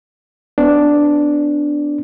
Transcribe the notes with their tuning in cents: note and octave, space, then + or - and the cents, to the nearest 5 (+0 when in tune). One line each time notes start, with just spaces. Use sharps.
B3 +30 D4 +0